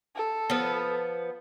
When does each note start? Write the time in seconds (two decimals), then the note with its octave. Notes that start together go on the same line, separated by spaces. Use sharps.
0.15 A4
0.50 F3 B3